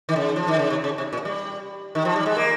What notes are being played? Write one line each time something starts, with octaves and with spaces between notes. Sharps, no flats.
D#3
C#3
F3
D#3
C#3
C3
C#3
C3
A#2
G3
D#3
F3
G3
G#3
A#3